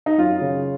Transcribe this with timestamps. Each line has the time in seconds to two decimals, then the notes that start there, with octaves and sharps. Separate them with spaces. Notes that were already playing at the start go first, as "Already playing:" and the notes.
0.06 D#4
0.18 F#2 F4
0.41 C#3